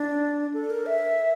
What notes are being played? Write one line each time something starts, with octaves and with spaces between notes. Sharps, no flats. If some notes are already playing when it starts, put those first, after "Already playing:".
Already playing: D4
A4
A#4
E5